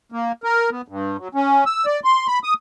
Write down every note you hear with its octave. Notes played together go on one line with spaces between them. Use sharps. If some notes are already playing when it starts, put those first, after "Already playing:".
A#3
A#4
B3
G2
F#3
C#4
E6
D5
C6
B5
D#6